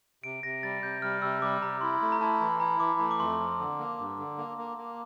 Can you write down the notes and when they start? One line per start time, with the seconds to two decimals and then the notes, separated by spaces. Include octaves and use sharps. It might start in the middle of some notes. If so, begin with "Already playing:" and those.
0.24 C3 D7
0.43 C3 A#6
0.63 G3 A6
0.83 C3 G6
1.02 G3 F6
1.22 C3 E6
1.42 G3 D6
1.62 C3 A#5
1.81 E4 C6
2.02 A3
2.12 A#5
2.21 E4 A5
2.40 E3
2.60 E4 A#5
2.80 E3 D6
2.99 A3 A#5
3.11 D6
3.19 F2 C6
3.39 F3
3.59 D3
3.79 A#3
3.99 G2
4.18 D3
4.38 A#3
4.57 A#3
4.77 A#3